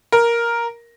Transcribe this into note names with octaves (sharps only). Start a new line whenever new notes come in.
A#4